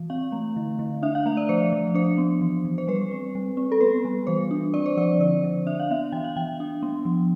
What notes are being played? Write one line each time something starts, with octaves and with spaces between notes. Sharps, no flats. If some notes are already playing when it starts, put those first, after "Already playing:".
Already playing: E3
C4 F5
A3
D3
D3
D4 E5
F5
A3 E5
D5
F3 C5
F3
D4 C5
B3
E3
E3
C5
G3 B4
C4
G3
C4
A4
B3 B4
G3
E3 C5
D4
C4 D5
C5
F3 D5
D3 D5
D3
D4 E5
F5
B3 E5
E3 G5
F5
E3 G5
D4
B3
F3